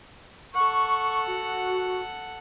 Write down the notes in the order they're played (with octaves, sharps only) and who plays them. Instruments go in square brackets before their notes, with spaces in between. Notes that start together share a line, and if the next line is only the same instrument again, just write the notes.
[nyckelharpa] A4 F#5 [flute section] C#6
[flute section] F#4